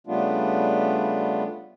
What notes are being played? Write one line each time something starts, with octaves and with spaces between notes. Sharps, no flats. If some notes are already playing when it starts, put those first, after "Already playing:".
C#3 G3 A3 B3 D4 F4